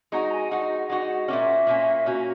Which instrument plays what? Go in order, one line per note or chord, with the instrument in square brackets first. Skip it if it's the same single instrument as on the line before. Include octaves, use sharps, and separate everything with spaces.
[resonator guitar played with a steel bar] G#3 D#4 F#4 [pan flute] A#5
[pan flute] G#5
[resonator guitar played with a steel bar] G#3 D#4 F#4 [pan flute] F#5
[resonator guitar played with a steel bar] G#3 D#4 F#4
[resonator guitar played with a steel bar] A#2 A#3 C#4 [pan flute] E5
[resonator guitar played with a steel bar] A#2 A#3 C#4
[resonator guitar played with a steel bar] A#2 A#3 C#4 [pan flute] F#4